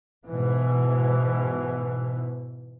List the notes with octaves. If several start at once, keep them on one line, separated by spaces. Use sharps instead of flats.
G#2 B2 E3